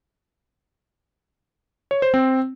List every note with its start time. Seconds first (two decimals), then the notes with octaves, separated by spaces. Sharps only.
1.91 C#5
2.02 C5
2.14 C4